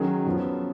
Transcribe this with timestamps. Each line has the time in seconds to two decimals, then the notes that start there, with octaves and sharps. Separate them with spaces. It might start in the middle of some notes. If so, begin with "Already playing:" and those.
Already playing: D#3 F#3 C#4 G#4
0.26 F#2 F3 B3